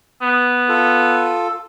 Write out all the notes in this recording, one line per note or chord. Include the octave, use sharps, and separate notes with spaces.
B3
F4 A4